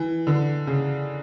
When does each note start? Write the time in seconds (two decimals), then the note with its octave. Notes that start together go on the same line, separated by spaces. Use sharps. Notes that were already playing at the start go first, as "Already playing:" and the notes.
Already playing: E3
0.27 D3
0.67 C#3